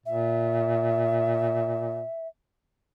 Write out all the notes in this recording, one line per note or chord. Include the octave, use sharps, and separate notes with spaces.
A#2 E5